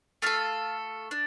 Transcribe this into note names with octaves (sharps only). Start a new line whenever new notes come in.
A3 F4 A4 F5
D4